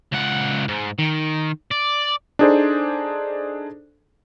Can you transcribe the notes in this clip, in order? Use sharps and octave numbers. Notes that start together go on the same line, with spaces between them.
C#2 F#5
G#2
D#3
D5
D4 D#4 G#4 A4 C5 D5